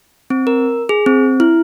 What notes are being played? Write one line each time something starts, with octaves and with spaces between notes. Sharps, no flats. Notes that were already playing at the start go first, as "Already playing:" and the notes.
C4
A#4
G#4
C4
E4